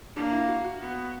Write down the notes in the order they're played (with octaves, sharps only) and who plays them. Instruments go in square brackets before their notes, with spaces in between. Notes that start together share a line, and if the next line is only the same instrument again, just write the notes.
[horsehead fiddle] A#3 [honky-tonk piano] D4
[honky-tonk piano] E4
F#4
F#4
[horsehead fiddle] B3